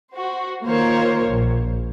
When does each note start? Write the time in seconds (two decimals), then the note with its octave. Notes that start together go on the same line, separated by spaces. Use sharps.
0.13 F#4 C5
0.64 D#3 A#3 F4 A#4 C5 C#5
1.27 A#1